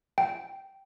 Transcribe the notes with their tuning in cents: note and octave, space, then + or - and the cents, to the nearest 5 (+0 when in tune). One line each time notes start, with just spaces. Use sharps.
G5 -10